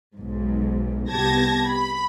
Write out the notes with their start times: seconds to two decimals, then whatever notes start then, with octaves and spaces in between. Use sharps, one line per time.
0.15 B1 G#2
1.10 C2 B3 G4 A5 G#6 A#6
1.69 B5